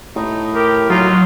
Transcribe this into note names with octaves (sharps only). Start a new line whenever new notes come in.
A2 D#4
G4 A#4
F#3 D#4 F4